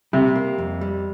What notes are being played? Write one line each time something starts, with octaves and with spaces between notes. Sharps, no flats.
C3 G3
A#3
F2
G3